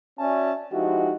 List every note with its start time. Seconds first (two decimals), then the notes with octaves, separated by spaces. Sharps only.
0.19 C#4 F#4 D5 E5 G#5 A5
0.72 F3 G#3 D#4 E4 F#4 G4